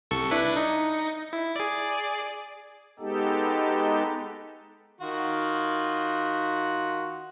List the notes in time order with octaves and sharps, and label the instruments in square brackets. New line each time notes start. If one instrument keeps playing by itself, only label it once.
[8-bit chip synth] C2 A4 C#6
D4 E4 B4
D#4 C#7
E4
G#4 D5
[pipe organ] G#3 B3 D#4 G4 A4
[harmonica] D#3 F4 F#4